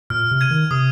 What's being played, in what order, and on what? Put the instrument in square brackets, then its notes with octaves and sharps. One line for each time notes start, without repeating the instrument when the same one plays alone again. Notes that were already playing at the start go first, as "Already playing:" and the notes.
[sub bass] A#2 [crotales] F6
[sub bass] C3
[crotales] G#6 D#7
[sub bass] D#3
[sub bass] C3 [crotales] D#6